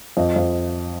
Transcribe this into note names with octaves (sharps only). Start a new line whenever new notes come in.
F2 D#5
F2